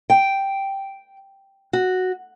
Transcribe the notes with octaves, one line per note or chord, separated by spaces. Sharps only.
G5
F#4